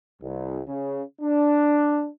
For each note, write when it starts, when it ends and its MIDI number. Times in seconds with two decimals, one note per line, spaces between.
0.22 0.61 36
0.67 1.02 49
1.22 2.08 62